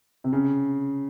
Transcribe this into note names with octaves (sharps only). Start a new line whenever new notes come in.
C3
C#3